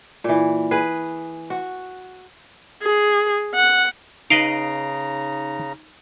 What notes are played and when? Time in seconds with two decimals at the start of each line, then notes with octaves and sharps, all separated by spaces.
0.24 A#2 E3
0.71 G#4 B4
1.50 F#4
2.82 G#4
3.55 F#5
4.30 C#3 D#4 B4 D#5 F5 A#5 C7 D7